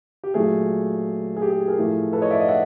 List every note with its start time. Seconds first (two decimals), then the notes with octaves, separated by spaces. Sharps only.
0.24 G4
0.34 A#2 F#3 A3 G#4
1.36 G#4
1.42 G4
1.51 G#4
1.68 G#4 A#4
1.78 A2 F3 A3
2.13 A4 B4
2.22 C#5 D#5
2.31 D5 E5
2.40 D#5 F5
2.48 E5 F#5